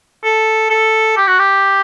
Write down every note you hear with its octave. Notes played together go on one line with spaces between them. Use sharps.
A4
A4
G4
F#4
G4